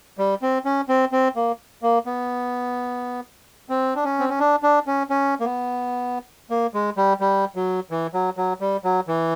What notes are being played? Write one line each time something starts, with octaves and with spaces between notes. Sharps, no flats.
G3
C4
C#4
C4
C4
A#3
A#3
B3
C4
D4
C#4
C4
C#4
D4
D4
C#4
C#4
A#3
B3
A#3
G#3
G3
G3
F#3
E3
F#3
F#3
G3
F#3
E3